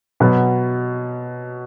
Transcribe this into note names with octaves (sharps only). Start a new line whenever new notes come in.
B2 F#3 B3